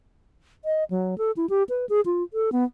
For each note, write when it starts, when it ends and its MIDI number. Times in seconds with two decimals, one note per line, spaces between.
0.65 0.84 75
0.90 1.18 54
1.18 1.31 69
1.37 1.46 64
1.50 1.63 67
1.69 1.86 71
1.89 2.01 68
2.06 2.23 65
2.34 2.50 69
2.52 2.64 59